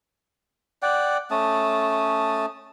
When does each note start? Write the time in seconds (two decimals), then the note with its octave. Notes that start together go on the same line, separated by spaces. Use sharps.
0.82 D5 F#5 G5
1.31 A3 C#4 A5 D#6